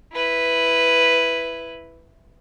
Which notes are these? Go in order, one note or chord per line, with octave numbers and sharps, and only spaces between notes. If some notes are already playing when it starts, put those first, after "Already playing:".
E4 B4